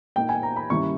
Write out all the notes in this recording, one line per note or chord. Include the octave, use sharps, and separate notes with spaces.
A#2 A#3 D#4 G5
G#5
A#5
B5
G2 D#3 A#3 C#4 E4 C#6